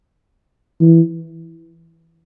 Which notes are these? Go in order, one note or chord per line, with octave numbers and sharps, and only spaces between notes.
E3